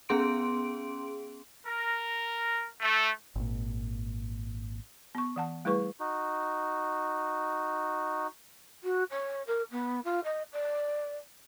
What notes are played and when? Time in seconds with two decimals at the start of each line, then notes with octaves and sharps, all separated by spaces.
0.09 B3 C#4 G#4 C6 D7
1.65 A#4
2.79 A3
3.36 G#1 A#2
5.15 B3 C#6
5.36 E3 F#5 A5
5.65 G3 A3 E4 G#4 B4 C#6
6.00 D#4 F#4
8.83 F#4
9.10 C#5
9.47 A#4
9.71 B3
10.05 F4
10.24 D#5
10.52 D5